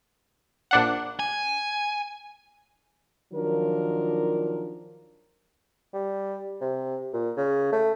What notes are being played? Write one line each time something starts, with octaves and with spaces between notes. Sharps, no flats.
A#1 D4 F#5
G#5
D#3 F3 F#3 D4 F4 A#4
G3
C3
A#2
C#3
A3